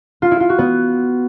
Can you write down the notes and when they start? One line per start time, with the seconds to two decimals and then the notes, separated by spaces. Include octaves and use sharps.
0.22 F4
0.31 E4
0.40 F4
0.49 F#4
0.58 B3